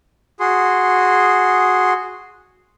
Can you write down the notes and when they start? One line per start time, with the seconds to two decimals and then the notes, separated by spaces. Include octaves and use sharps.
0.40 F#4 G#4 C6